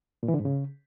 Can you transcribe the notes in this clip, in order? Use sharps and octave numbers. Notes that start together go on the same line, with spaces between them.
A#2
E3
D3
G#2
C#3